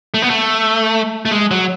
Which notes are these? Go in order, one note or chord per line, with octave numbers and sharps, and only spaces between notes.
A3
B3
A3
A3
G#3
F#3